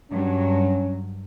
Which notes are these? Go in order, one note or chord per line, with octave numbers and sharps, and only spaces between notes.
G2 F#3 C#4